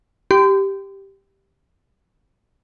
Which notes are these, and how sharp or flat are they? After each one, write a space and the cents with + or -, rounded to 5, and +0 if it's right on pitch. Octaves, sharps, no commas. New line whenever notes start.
G4 +0 C6 -35